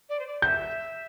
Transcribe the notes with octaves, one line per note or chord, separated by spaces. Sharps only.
D5
C5
D5
E5 G6